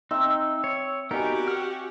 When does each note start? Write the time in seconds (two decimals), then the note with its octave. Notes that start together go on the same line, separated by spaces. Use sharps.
0.11 C4 D#4 E5
0.64 C#5
1.11 B3 D#4 F#4 G4 A#4 D5 G#5
1.48 F6